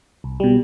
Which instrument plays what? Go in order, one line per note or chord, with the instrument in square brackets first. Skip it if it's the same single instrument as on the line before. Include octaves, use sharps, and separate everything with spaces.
[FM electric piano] C2
B2 G3